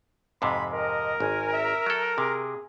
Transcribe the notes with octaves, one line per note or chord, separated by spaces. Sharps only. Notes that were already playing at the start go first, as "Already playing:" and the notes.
F2 G#2 C3 B5
A#4 D#5
G#1 G#5
E5
F#3 A4
C3 G#4